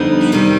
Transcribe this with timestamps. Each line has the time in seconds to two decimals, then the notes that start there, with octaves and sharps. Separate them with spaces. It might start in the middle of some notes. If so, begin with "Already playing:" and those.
Already playing: F2 D3 G3 B3 D#4
0.32 C3 D#3 G3